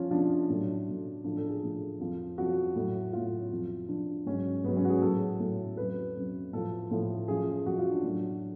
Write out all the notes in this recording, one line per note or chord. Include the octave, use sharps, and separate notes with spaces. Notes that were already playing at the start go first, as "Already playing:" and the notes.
Already playing: F#2 F3 C#4 F4
F#2 F3 D4
A2 F#3
A2 F#3
A2 F3 D4
A4
G#4
A2 F3
F2 F3
F2 F3 F#4
A2 F#3
A2 F#3 F4
F2 F3
F2 F3 D4
G#2 F#3 C#4
G#2 F#3 B3
C#4
F#4
G#4
A2 F#3 A4
A2 F#3
F2 C#3 F#3 B4
F2 C#3 F#3
A2 F3 A4
A2 F3
F#2 F3 G#4
F#2 F3 F#4
F4
D4
A2 F#3